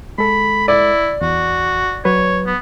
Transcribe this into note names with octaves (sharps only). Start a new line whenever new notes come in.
G#3 A4 B5
E4 D5
E2 F#4
F#3 B4 C#5
B3